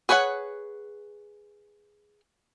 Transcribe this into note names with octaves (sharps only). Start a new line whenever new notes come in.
G#4 B4 C#5 D#5 F#5